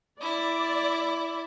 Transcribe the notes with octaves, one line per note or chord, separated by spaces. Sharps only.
E4 D5